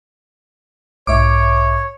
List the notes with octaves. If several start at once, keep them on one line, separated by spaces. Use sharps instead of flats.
B1 G#2 C#5 E5 D6